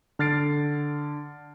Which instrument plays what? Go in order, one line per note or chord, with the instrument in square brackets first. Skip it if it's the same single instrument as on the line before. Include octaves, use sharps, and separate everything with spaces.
[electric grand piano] D3 F6 A6 C7 D7